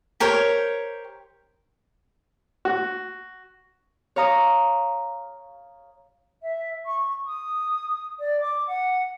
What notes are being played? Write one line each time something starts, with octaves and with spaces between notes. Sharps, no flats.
G4 A#4 C5 C#5
F#4
C#5 F5 A#5 D#6
E5
C#6
D#6
D5
D6
F#5